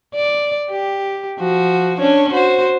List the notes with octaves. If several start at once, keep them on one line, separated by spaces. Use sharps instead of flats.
D5
G4
F3 F#4
C#4 D4 C#5
F#4 C5